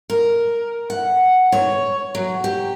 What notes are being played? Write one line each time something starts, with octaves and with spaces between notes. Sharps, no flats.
A#4
F#5
C#5
F#3
G4